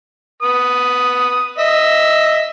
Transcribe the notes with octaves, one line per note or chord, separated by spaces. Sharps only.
B4 D#6
D#5 E5